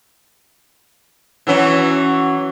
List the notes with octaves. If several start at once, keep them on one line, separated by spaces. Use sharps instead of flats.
E3 F#3 C#4